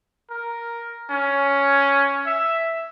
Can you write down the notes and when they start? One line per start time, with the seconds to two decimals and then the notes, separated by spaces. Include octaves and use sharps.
0.30 A#4
1.10 C#4
2.26 E5